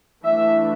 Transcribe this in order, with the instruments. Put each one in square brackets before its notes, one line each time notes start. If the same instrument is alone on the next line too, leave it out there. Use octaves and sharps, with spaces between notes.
[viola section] E3 A3 D4 E5